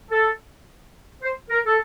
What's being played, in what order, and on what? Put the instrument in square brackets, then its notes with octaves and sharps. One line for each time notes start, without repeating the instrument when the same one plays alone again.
[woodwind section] A4
C5
A#4
A4